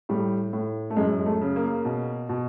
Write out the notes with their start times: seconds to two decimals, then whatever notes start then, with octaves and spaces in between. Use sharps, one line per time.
0.09 A2 G3
0.53 A2
0.90 A3
0.97 F#2 G#3
1.19 G#3
1.26 A3
1.41 C#3
1.56 A#3
1.85 B2
2.29 B2